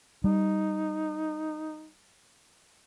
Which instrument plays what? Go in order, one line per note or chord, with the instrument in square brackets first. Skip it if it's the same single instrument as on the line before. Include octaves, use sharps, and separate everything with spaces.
[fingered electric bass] G3 [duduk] D#4